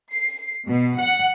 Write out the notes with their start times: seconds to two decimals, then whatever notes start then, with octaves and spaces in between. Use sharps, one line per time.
0.13 C7
0.68 B2
0.97 F#5